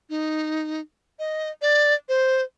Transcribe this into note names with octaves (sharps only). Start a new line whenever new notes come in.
D#4
D#5
D5
C5